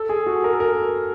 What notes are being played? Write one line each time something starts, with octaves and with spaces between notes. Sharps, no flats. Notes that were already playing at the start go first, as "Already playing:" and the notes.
Already playing: A4
G#4
F#4
A#4
A4
A#4